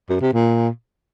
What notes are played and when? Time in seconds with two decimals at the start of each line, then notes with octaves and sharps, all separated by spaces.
0.09 F#2
0.21 C3
0.33 A#2